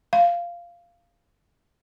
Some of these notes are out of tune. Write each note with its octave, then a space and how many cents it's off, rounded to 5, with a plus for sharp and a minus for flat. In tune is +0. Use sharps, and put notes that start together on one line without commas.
F5 -10